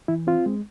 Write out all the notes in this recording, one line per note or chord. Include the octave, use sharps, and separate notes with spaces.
E3 E4
C4 F4
G#3